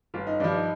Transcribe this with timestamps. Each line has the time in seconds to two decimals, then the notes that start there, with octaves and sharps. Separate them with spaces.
0.14 G1 F4
0.27 D#4
0.40 G2 F3 D4
0.53 D#4